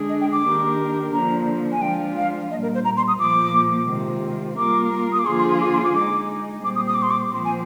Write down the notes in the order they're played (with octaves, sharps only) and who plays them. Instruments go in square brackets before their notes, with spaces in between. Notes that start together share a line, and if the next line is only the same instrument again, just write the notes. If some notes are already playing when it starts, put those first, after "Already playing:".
Already playing: [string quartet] D3 G#3 D4 G#4
[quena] D#5
G5
D6
[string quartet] D#3 A#3 D4 G4 A#4
[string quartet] D3 F3 A#3 D4 [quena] A#5
[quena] G#5
[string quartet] F3 G#3 D4 F4 [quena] G5
[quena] F5
[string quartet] A#2 G3 A#3 [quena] D#5
[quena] A#4
C5
A#5
C6
D#6
[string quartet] A#2 F3 A#3 [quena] D6
[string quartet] C3 D#3 G#3 C4 F4
[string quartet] G3 A#3 F4 A#4 [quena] D6
[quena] D#6
D6
[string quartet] D3 F3 A#3 F4 G#4 [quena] C6
[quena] C6
C6
D6
C6
D6
[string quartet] G#3 D#4 G#4 [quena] D6
[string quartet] A#2 G3 C4 [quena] D6
[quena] D#6
D#6
D6
C6
D6
[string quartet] A#2 F3 C4 [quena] C6
[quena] G#5